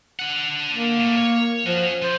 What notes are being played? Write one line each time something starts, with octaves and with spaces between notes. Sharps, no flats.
D4 F#5
A#3
A2
C#5
F3 C#4 F#4
F3 C5